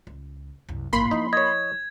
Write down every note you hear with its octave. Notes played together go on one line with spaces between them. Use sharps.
C#2
C2 F#2
A1 G#2 A#3 B5 C6
F3 D#4 E4
C#5 D#5 G#6